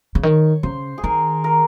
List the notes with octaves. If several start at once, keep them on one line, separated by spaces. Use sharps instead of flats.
C#3
D#3 C#5
C#3 C5
G#4
D#3 A#4
A#4